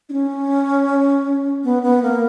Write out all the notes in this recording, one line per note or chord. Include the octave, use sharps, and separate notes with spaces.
D4
C#4
B3
B3
A#3